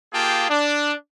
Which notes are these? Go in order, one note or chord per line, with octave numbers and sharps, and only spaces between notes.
A#3 F4 G4 G#4 G5 A5
D4